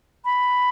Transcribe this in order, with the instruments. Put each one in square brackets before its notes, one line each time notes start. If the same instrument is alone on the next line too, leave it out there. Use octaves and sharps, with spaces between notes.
[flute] B5